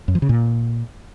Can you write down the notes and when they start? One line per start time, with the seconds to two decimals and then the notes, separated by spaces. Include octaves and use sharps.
0.08 F#2
0.15 F3
0.22 C#3
0.29 A#2